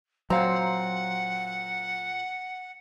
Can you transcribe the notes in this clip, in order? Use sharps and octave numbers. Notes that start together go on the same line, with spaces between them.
A#2 F#3 C4 F5 F#5 A#5